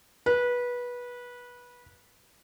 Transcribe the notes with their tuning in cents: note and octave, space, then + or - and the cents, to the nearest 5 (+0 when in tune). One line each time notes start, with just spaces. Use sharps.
B4 -20